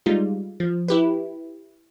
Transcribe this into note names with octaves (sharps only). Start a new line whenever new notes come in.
G3 G#3 D#4 F4
F3
E4 G4 B4